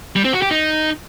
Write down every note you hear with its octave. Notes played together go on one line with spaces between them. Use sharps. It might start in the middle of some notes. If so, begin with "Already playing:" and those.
G3
C4
F#4
G4
D#4